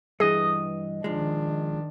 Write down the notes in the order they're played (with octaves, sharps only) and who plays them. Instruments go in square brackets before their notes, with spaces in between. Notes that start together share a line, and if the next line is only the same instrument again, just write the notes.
[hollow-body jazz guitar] G2 E3 [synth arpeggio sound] G#4 [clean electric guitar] D#5
[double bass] D#3 D4 [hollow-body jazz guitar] F3 G#3